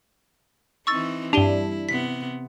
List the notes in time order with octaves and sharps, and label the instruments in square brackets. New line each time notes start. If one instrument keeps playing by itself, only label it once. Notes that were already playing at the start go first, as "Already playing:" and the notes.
[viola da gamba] E3 C4 D#4 [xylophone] C#6 E6 A6
[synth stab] G2 D4 [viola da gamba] E4 [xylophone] G4 D#7 G7
[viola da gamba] C3 B3 [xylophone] B6